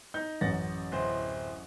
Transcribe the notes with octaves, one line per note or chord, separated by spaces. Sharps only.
D#4 G6
A1 F#2 F#5 A6 A#6
D1 C5